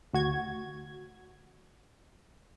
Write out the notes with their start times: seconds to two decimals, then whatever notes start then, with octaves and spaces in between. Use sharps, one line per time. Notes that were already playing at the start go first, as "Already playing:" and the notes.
0.13 D2 F#4 G#6